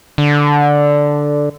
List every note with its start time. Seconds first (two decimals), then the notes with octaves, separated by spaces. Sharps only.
0.18 D3